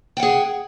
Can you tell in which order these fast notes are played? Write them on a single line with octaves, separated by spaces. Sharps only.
G5 F#5 G#4